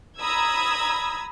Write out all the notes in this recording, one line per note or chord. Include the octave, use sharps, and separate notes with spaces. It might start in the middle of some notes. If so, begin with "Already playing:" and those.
A#5 B5 D#6 E6 G#6